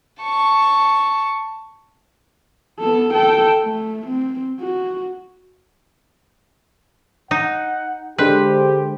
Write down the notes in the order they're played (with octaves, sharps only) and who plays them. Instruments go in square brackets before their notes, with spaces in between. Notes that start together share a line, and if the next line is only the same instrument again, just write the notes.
[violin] A5 C#6
[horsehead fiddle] B3 A4
A4 G5
A3
C4
F#4
[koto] D#4 [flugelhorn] F#5
[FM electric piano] D3 G#3 C5 [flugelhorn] G4 [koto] B4